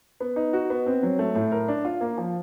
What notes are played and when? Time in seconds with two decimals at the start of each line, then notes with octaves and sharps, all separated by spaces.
0.20 B3
0.36 D#4
0.53 F#4
0.70 B3
0.86 C4
1.03 F#3
1.19 A3
1.35 A2
1.52 A#4
1.68 D4
1.85 F4
2.01 A#3
2.18 F3